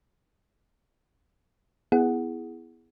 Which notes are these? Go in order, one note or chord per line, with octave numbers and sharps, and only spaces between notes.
B3 E4 G#4 F#5